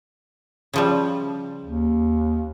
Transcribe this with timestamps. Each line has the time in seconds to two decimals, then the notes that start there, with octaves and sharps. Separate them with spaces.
0.74 C#3 F3 G3
1.64 D#2